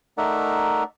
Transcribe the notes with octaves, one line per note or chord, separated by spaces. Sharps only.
A3 D#4 A#4 D5 E5 F#5